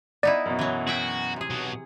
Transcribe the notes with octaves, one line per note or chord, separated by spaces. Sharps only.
B3 D#4 E4 D5
F#2 B2
E3 F#3
F#4 G#4 E5 G5
C3 G#4
B2 F#3